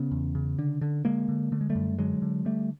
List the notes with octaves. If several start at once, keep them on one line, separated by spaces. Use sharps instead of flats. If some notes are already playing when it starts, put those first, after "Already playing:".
Already playing: C#3 B3 C#4
E2
C#3
D3
D3
D3 G#3 A#3
D3
D3 A3
G#3
G3 A3
F#2
D3 F#3 G#3
D3
D3 G3 A3